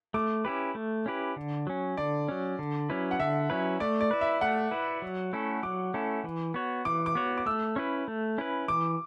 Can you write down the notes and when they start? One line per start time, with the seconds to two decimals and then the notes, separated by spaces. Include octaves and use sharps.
0.14 A3 D6
0.45 C#4 E4 G4 B4
0.75 A3
1.06 C#4 E4 G4 B4
1.36 D3
1.67 F#3 C#4
1.97 D3 D5
2.28 F#3 C#4
2.59 D3
2.90 F#3 C#4 E4 B4
3.11 F#5
3.19 D3 E5
3.50 F#3 C#4 E4 B4
3.80 A3 D5
4.01 D5
4.11 E4 B4
4.21 E5
4.41 A3 F#5
4.71 E4 B4
5.02 F#3
5.33 A3 C#4 E4 A4
5.63 F#3 D6
5.94 A3 C#4 E4 A4
6.24 E3
6.54 B3 F#4 C#5
6.85 E3 D6
7.06 D6
7.15 B3 F#4 C#5
7.38 D6
7.46 A3 E6
7.76 C#4 E4 B4
8.08 A3
8.38 C#4 E4 B4
8.68 E3 D6